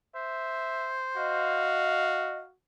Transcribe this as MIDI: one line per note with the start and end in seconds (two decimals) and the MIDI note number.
0.15 1.76 72
0.15 1.02 76
1.16 2.55 66
1.16 2.37 75
1.16 2.50 77